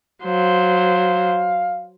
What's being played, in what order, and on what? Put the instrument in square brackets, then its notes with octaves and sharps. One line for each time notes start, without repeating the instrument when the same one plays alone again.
[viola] F#3 C5 [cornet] F5